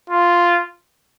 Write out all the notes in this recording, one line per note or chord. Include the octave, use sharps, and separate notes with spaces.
F4